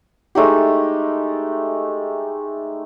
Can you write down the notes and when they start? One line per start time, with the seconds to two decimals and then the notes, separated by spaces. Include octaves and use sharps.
0.35 G#3 A3 D#4 G4